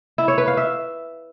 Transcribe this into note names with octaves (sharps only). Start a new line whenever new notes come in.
E4
C#5
B4
F5
E5